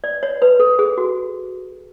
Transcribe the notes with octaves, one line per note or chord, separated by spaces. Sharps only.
D5
C#5
B4
A4
G#4
F#4